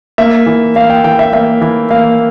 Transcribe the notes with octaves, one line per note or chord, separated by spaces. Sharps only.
A#3 E5
E3
A#3 F5
G5
E3 G5
E5
A#3 E5
E3
A#3 F5